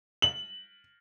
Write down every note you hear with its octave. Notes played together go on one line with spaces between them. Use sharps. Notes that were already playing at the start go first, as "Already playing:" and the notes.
F#7